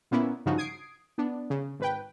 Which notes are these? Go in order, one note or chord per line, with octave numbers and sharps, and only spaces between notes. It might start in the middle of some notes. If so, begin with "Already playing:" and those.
A#2 A#3 B3 C#4 E4
G2 C#3 F3 D#4 F#4
D#6 G#6 C7 D7
B3 D4
C#3
G#1 B4 G5